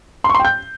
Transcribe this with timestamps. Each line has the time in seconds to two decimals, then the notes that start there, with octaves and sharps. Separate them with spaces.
0.24 C6
0.29 C#6
0.34 C6
0.40 G5
0.45 G6